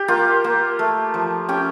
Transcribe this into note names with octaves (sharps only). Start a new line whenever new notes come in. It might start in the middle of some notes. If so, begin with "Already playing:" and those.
Already playing: G4
A#3 F4
A#3
A3
F3
C#4 G4